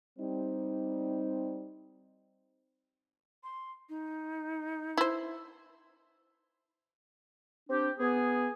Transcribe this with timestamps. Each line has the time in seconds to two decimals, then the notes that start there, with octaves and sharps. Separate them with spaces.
0.19 G3 C4 D#4
3.44 C6
3.89 D#4
4.97 E4 C5
7.70 C4 D4 G4
7.99 B3 G#4